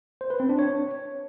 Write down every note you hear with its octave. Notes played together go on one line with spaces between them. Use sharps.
C5
B4
C4
D4
C#5